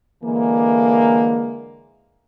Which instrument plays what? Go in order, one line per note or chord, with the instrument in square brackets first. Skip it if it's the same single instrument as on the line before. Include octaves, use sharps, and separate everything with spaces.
[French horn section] D3 E3 G#3 A#3